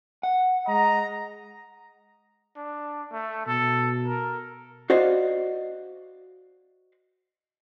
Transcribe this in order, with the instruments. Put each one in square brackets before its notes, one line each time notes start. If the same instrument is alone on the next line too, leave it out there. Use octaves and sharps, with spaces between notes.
[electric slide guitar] F#5
[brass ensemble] G#3 D#5 A#5
[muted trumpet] D4
A3
[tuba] B2 [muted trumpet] A4
[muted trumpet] A#4
[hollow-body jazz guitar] F#4 C5 D5 D#5 F5